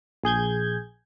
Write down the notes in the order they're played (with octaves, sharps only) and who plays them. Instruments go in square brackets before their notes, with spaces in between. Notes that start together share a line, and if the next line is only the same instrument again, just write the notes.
[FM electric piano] A#1 G#4 G6 G#6